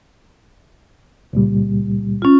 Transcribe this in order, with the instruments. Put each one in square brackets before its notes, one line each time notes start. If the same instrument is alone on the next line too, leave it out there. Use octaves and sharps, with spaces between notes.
[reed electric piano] C#2 A#2 G3
[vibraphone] C#4 F4